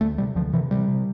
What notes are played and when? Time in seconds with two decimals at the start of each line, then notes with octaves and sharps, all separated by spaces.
0.01 D2 A3
0.18 C3 G3
0.36 D2 F3
0.53 C3 E3
0.71 C3 G3
0.88 C3